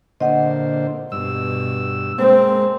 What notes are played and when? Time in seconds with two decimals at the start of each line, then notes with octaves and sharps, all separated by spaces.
0.20 A#2 D3 C5 D#5 F#5
1.12 G2 B2 E6
2.19 G#3 A#3 C4 C5